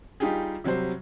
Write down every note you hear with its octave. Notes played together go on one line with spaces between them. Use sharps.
G3 D#4 F4 G4 G#4
C3 F#3 G3 C5